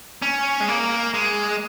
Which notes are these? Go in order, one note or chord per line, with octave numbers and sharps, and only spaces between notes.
C#4
G#3
A#3
G#3